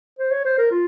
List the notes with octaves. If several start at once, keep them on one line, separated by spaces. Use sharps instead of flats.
C5
C#5
C5
A#4
F4